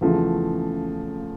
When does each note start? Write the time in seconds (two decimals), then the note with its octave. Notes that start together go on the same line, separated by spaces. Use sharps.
0.01 E2 C#3 F3 A3